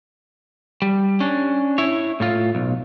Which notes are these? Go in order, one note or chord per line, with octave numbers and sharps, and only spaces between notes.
G3
C#4 D4
E4 C#5
A2 F4
B1